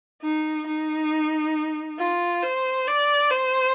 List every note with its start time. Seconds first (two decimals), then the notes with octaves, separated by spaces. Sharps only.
0.22 D#4
0.66 D#4
1.99 F4
2.42 C5
2.87 D5
3.31 C5